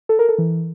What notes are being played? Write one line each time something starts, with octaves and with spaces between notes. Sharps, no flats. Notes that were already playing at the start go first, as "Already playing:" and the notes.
A4
A#4
A4
E3